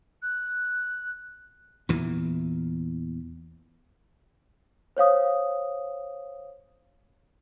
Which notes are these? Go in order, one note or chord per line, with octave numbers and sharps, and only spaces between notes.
F#6
E2 A#2 E3
C5 C#5 F5 D#6